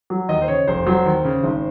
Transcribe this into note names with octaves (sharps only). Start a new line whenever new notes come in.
F#3
D#2 D#5
C5
C#3 C#5
F1 C5
F#3 C5
D#2
C#3
G#1